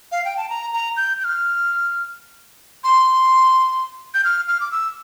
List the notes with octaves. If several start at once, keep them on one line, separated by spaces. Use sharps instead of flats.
F5
G5
A5
A#5
A#5
G6
G6
F6
C6
G6
F6
F6
D6
E6